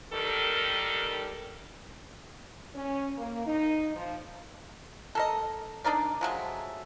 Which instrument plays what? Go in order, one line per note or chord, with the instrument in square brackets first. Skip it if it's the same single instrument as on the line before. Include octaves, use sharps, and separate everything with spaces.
[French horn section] D#3 G3 A4 A#4
C#4
A#3
D#4
F3
[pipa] A4 A#4 D#5
D4 D#4 A#4 D5
F3 F#3 G#3 A3